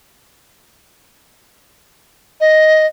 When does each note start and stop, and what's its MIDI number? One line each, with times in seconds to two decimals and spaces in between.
2.41 2.86 75